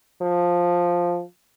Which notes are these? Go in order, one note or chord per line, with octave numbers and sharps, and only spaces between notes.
F3